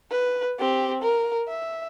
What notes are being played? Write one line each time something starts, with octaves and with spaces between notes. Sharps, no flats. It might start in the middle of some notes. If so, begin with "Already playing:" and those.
B4
C4 G4
A#4
E5